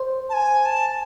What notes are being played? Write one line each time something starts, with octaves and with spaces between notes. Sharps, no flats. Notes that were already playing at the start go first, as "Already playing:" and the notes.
Already playing: C5
A5
G#5
A5